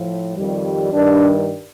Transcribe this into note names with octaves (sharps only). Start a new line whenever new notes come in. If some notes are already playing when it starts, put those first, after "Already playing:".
Already playing: A2 F3
F2 D#3 G3
G2 D#3 G3 D4